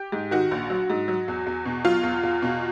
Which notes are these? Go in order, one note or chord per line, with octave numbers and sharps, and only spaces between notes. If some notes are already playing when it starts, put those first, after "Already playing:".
Already playing: G4
G#2
D#3 F#4
A#1
F#3
G#2
F#3
E2
E2
B2
F#3 F4
E2
E2
B2